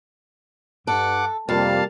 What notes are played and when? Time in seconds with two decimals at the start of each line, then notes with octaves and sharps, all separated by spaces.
0.87 G2 A4 F#5 D6
1.49 F2 C3 G3 A#3 F5 A5